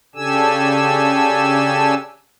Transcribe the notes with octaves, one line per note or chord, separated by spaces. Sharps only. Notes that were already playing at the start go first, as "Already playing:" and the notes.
C#3 D4 G4 A4 G#5 E6